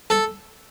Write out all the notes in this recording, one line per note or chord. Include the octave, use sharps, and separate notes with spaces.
A4